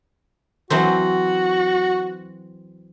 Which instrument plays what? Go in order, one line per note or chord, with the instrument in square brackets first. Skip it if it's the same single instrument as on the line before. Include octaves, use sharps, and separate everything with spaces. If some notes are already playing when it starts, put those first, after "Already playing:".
[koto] E3 F#3 C4 [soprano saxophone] F#4